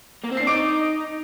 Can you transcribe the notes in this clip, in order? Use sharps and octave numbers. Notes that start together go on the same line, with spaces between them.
A#3
C4
D4 C7
D#4 D6 D7